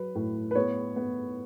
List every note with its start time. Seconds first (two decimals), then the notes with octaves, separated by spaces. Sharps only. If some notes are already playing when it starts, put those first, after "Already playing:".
Already playing: F#3 B4
0.15 A2
0.51 B4
0.55 B3 C#5
0.96 B3